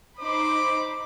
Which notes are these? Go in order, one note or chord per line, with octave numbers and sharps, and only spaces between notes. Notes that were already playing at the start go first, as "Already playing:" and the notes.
D#4 C5 B5 D6